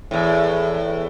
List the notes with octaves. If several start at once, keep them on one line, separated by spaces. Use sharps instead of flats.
E2 A2